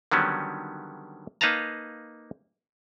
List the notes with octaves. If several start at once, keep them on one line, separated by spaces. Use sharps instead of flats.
D3 D#3 F#3 G3 B3 C#4
A#3 D#4 B4 F5 A5 A#5